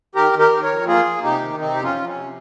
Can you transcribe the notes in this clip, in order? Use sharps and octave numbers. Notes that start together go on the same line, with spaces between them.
D#3 G4 A#4
D#3
G4 A#4
D#3
A#4 C#5
F2
A#3 F4 G#4
A#3
C3 D#4 G4
D#3
C3 C4 D#4
F2 G4
C#4 F4
F2
C#4
C3